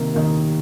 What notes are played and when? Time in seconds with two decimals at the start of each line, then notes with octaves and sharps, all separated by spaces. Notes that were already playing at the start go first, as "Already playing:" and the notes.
Already playing: C3 D#3 A#3
0.14 D#3 A#3